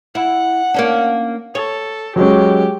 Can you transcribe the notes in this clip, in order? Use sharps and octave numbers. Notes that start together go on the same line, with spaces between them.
E4 F#5
A#3 C#4 D4
A4 C#5
F#3 G#3 C#4 G4